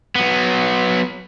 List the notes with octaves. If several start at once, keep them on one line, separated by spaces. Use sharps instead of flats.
F#3 B3